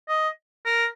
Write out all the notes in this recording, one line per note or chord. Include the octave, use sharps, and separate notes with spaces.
D#5
A#4